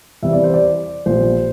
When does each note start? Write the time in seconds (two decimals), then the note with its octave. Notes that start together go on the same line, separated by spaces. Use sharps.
0.23 E2 C3 G3 E5
0.33 D5
0.44 C5
0.54 D5
1.06 A#1 A#2 G3 C5